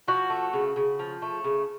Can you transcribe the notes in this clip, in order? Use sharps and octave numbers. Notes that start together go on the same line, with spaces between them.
F3 F#4
A3
C#3
C#3
F3
A3
C#3